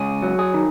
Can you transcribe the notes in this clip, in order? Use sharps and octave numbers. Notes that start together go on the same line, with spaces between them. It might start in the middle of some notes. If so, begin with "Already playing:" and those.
Already playing: C#2 G#4
F#3
G#4
D#3